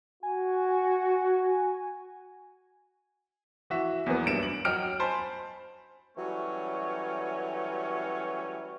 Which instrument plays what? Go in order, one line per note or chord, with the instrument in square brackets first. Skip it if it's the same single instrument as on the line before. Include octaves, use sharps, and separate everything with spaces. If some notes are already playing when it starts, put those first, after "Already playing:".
[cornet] F#4 [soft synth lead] G#5
[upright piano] E3 F#4 E5
E2 E3 F#3 A#3 B3
B1 G2 A#3 D7 E7
F#7
F#3 D#5 G5 F6 D7
C5 G#5 A5 B5 C6
[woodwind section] E3 F#3 G3 A3 C#4